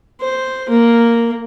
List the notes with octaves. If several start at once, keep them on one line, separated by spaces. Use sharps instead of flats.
C5
A#3